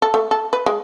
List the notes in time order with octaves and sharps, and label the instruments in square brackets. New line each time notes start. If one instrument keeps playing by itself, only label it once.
[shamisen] A4
A3
A4
B4
G#3